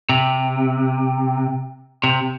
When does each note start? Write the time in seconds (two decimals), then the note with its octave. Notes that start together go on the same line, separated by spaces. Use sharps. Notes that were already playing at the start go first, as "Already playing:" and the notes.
0.09 C3
2.04 C3